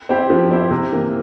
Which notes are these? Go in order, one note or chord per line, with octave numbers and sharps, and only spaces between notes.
C4 E4 G4
F3
C4 E4 G4
C3
E3 A#3